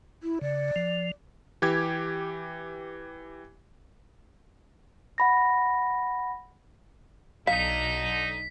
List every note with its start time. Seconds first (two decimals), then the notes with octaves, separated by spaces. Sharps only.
0.23 E4
0.41 C#3 D5
0.76 F3
1.62 E3 G4 G#6
5.18 F#5 B5 A#6
7.47 B1 D3 D#4 F5 B6